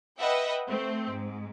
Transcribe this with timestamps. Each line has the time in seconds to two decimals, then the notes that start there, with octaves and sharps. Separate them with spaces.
0.18 B4 D#5 E5 F#5 G5
0.69 A3 C4
1.13 G#2